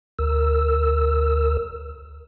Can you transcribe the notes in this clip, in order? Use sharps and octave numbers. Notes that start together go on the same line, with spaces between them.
D2 A#4 E6